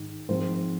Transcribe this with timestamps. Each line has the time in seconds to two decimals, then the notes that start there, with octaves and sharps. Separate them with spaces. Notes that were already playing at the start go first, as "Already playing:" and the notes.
Already playing: G#2 D#3
0.29 G#2 F3 C4 C5